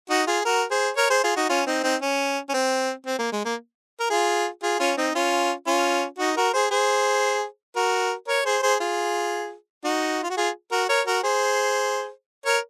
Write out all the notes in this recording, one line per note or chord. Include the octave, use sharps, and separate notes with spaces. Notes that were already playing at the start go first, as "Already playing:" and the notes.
D#4 F#4
F4 G#4
F#4 A#4
G#4 C5
A#4 C#5
G#4 C5
F4 G#4
D#4 F#4
C#4 F4
C4 D#4
C4 D#4
C#4
C#4
C4
C4
A#3
G#3
A#3
A#4
F4 G#4
F4 G#4
C#4 F4
C4 D#4
C#4 F4
C#4 F4
D#4 F#4
F#4 A#4
G#4 C5
G#4 C5
F#4 A#4
A#4 C#5
G#4 C5
G#4 C5
F4 G#4
D#4 F#4
F4
F#4
F4 G#4
F#4 A#4
A#4 C#5
F#4 A#4
G#4 C5
A#4 C#5